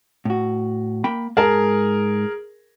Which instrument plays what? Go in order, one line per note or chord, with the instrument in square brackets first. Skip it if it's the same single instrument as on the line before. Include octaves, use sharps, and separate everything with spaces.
[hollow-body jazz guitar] A2 F#4
A#3 G5 B5
[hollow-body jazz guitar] G#2 A5 [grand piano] G#4 A#4